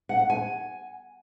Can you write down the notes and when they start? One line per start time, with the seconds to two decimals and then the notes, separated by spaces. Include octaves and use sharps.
0.09 F#5
0.19 F#5
0.30 G#5